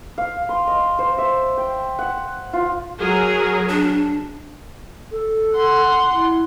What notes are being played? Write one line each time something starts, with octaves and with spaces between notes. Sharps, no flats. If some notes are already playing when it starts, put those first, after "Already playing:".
F5
C6
D#5
C5
E5
G5
F#5
F4
F#3 G#4 A#4
D4
A4
F#5 C6
E4